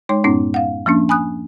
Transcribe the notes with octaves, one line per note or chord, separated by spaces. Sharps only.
G#3 D#4 C#5 C6
F#2 A2 B3 C#4 D#4
F5 F#5
F3 A#3 C#4 D4
G#5 B5 D#6 F#6